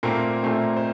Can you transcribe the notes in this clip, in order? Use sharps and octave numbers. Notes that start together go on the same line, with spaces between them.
A#2 A3 A#3 C4 A#4
A#2 A3 C4
C5